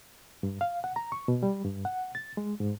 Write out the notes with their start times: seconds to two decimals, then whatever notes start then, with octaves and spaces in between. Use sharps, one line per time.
0.43 G2
0.61 F5
0.84 F#5
0.96 A#5
1.12 C#6
1.28 B2
1.43 G3
1.65 G2
1.85 F#5
2.15 A6
2.37 G#3
2.60 G#2